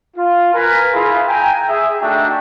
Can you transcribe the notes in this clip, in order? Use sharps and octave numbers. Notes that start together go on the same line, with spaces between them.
F4
A#4 B4 G#5
E4 F4 G#4
G5 G#5 A#5
G#4 E5
A3 D4 D#4 F#4 E5 G5